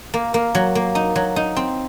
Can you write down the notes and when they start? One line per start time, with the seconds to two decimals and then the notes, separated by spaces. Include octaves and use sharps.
0.14 A#3
0.34 A#3
0.55 F#3
0.75 A#3
0.95 D#4
1.16 F#3
1.36 D#4
1.56 C4